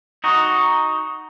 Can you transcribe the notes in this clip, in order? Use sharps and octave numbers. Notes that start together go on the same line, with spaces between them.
D#4 F#4